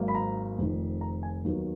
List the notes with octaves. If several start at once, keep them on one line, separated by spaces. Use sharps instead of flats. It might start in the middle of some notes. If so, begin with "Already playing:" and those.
Already playing: G#1 G#2 F#3 A#3
B5
A#5
F1 F2 D#3
A#5
G#5
D#2 D#3 F#3 B3